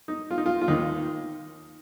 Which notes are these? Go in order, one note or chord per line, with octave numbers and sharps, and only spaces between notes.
D#4
F4
D#4
F4
F4
D#2 D#3 D#4